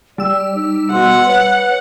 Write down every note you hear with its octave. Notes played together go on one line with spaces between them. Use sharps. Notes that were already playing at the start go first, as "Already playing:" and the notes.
G3 D5 E6
D#4
B2 F#5 C6
B4 C#5